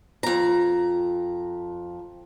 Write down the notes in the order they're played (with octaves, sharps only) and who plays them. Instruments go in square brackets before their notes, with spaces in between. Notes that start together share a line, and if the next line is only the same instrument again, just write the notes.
[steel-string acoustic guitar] F2 A#5